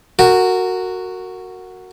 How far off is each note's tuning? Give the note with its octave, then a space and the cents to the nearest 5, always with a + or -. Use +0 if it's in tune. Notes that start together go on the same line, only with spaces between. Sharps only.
F#4 +0 A#4 -25